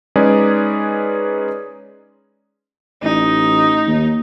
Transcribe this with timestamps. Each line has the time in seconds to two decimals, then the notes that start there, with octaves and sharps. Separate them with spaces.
0.16 G#3 C#4 D#4 G#4 B4 D5
3.03 A1 D#4
3.87 D#2